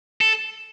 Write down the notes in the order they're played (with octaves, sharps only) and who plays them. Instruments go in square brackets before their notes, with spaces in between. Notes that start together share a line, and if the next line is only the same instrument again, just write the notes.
[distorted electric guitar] A4